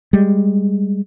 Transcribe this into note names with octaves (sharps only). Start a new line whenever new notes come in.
G3 G#3